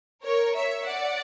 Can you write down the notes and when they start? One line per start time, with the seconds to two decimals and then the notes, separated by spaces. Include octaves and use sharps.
0.23 A#4 C#5
0.55 C#5 E5
0.85 D5 F#5